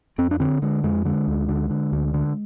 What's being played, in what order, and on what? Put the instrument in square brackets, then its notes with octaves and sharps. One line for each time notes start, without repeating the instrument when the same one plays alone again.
[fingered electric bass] F2 C4
D4
D3 C4
D3 G#3
F2 G#3
D3 G#3
D2
D3
D3
D2
D3